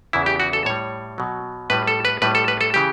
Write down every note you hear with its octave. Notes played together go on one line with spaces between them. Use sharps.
E2 C#3 E3 E4
G4
F#4
A4
A2 G3 C#5
B2 F#3
A2 G3 B4
A4
B4
A2 G3 B4
A4
B4
A4
C#3 E3 G4